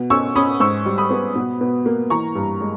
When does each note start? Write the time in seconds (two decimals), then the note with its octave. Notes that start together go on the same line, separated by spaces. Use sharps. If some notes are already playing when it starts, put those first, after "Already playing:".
Already playing: B2
0.10 C#4 C#6 E6
0.36 C#4 B5 D#6
0.60 G#2 C#6 E6
0.86 G3
0.98 B5 D#6
1.10 B3
1.35 B2
1.61 B2
1.86 A#3
2.10 E3 A#5 C#6
2.35 G2
2.61 G#3